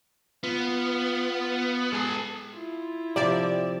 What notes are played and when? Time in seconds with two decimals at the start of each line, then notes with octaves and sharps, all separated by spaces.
0.44 B3 F4
1.93 G#3 A4 G#5
2.55 E4 F4
3.16 C3 F3 D5 E5